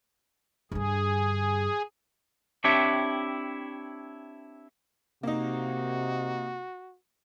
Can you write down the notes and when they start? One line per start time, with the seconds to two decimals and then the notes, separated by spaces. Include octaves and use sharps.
0.72 G2 D3 G#4
2.64 C4 D4 E4 G4 C#5 E5
5.23 C3 A#3 D#4 F#4